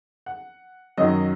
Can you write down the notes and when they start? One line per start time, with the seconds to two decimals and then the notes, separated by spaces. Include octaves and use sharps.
0.26 F#5
0.97 F#2 D#3 F#3 D#5